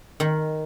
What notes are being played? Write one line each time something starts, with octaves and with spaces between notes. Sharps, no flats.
D#3